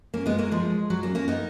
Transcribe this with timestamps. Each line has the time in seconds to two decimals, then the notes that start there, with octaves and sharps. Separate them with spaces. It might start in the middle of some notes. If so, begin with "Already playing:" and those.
0.14 A#3 C#4
0.26 G#3 B3
0.38 F#3 A#3
0.51 F3 G#3
0.90 F#3
1.03 A#3 C#4
1.15 A#3 C#4
1.28 B3 D#4